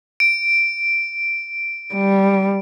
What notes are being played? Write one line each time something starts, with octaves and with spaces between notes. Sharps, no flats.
D7
G3